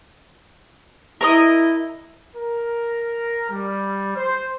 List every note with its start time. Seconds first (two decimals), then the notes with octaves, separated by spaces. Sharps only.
1.21 E4 A#4 C#5 D#5
2.35 A#4
3.50 G3
4.16 C5